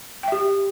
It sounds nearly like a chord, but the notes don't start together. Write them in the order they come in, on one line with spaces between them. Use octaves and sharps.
G5 E5 G4